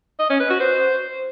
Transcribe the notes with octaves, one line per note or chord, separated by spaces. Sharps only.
D#5
C#4
B4
F#4
C5